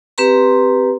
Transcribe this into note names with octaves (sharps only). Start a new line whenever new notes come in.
C4 G4 B4 A#5 C6